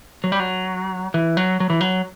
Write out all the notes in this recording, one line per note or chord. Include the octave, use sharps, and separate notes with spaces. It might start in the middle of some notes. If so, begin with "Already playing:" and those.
F#3
G3
F#3
E3
F#3
F#3
E3
F#3